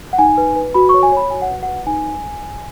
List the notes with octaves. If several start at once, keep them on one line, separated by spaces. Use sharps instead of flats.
F#5
D#4 G#5
B4
B4
F#4 B5
C#5 C#6
G#5
C#5 B5
F#4 G#5
F#5
B4
F#5
B4
D#4 G#5